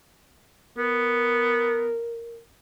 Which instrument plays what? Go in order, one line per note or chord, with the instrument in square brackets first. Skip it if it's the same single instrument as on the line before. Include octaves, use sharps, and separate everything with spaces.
[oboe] B3 [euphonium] A#4